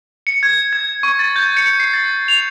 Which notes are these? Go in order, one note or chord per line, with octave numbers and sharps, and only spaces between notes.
C#7
G#6
G#6
C#6
A6
G6
C#7
C7
A6
F7